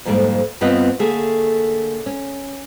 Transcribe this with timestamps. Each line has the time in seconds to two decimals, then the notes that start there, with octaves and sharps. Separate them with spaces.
0.05 F2 G#2 D3 G3 A#3
0.61 G2 B3 C4 F4 B4 D#5
0.99 D3 A3 A#3 G#4
2.06 C#4